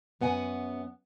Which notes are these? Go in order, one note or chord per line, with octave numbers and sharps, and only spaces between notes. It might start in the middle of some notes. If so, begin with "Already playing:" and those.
F#2 B3 F#5 G#5